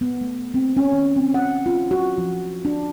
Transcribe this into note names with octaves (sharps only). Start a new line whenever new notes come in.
B3
A3
C4
C#4
D#3
C4
F#5
F4
F#4
F3
D4